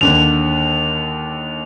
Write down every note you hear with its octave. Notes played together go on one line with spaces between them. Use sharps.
D#2 D3 F7